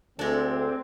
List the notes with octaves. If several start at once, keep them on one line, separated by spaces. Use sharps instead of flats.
D2 G#3 C4 D4 A4